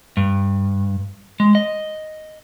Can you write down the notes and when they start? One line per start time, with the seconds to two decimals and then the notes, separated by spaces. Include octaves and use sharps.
0.17 G2
1.40 G#3
1.55 D#5